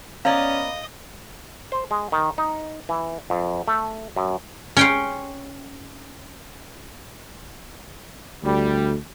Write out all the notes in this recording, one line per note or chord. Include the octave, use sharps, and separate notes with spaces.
B3 C#4 D5 D#5 F5 A#5
C5
G#3
D#3
D#4
E3
F2
A3
F#2
C#4 G5 C6
D2 G3